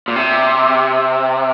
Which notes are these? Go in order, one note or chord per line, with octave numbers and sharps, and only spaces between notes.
A#2
C3